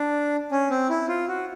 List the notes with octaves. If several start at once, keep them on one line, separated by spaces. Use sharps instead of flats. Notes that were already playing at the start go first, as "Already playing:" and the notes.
Already playing: D4
C#4
C4
E4
F4
F#4